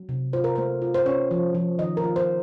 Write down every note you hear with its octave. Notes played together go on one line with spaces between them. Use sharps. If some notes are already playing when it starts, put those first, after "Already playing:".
Already playing: F#3
C3
F4 C5
A#4
A3 C5
F4
C5
C#4 C#5
F3
F3
D#3 D#5
A#4
F4
C5